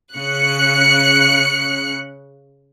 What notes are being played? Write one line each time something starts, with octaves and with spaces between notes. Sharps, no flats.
C#3 F#6 C#7